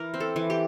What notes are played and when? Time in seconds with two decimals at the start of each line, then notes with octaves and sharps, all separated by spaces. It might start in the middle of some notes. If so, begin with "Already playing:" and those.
Already playing: E3 A#4
0.14 C4
0.20 A4
0.36 E3
0.50 G4